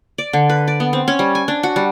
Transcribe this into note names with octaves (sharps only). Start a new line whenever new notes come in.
D5
D3
B4
D5
B3
C4
C#4
G3
G#5
D4
F#4
G3